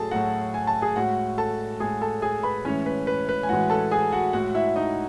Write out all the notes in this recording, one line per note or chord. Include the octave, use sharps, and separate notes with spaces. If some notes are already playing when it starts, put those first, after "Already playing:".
Already playing: A2 F#3 G#4 A4 A5
A2 F#3 F#4 F#5
G#5
A5
G#4 G#5
A2 G#3 F#4 F#5
A4 A5
A2 G#3 G#4 G#5
A4 A5
G#4 G#5
B4 B5
A2 E3 G#3 C#4 C#5
B4
B4
B4
G#5
A2 E3 G#3 F#4 F#5
A4 A5
G#4 G#5
F#4 F#5
A2 G#3 F#4 F#5
E4 E5
D#4 D#5